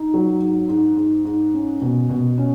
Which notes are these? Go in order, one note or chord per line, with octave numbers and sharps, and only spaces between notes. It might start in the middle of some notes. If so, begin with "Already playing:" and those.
Already playing: D#4
F#3
G#2
G#2
G#2
G#2
C#4
B2
B2
C#4